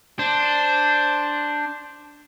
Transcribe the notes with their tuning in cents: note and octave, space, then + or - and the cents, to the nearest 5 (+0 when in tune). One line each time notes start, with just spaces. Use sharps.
D4 +0 C5 +0